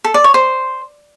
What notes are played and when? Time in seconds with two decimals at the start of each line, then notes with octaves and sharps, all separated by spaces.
0.04 A4
0.14 D5
0.24 C#5
0.34 C5